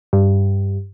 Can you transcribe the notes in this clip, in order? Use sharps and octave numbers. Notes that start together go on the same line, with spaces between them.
G2